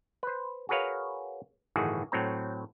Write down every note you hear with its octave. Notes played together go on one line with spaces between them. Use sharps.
B4 C5
F#4 G#4 A#4 B4 C#5 F5
G1 A2 D#3 E3 F#4 G#4
A2 F#3 C4 A#5